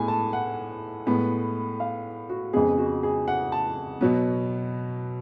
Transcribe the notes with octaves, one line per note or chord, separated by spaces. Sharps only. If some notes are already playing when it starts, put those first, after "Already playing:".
Already playing: A2 G#3 B3 G#5
A5
F#5
A2 G#3 B3
F5
F#4
F2 C#3 G#3 B3 G#4
F#4
G#4
F#5
A5
B2 F#3 B3